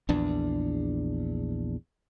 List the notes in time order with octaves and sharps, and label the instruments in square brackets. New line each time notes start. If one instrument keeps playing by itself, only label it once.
[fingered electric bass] A#1 E2 D4